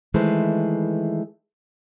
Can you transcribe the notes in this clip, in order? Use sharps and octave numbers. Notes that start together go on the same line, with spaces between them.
D#3 E3 G#3 A3 B4 C5